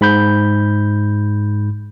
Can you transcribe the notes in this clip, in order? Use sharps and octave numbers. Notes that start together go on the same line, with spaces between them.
G#2 B5 G6